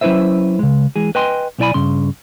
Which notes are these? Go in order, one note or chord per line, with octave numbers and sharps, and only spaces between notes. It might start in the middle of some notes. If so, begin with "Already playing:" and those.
F#3 C#4 E4 B4 C5 E5
C#3 G#3
E3 G#3 G#4
B4 D#5 G5 G#5 C6
B1 B3 E4 D5 G#5 B5
G2 C#3 C6